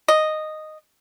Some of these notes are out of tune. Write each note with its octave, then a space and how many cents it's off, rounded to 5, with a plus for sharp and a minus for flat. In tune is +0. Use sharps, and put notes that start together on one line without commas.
D#5 -5